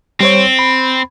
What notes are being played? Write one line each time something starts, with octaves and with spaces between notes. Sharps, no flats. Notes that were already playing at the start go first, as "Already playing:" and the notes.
G3 C4 C5 C#5
B5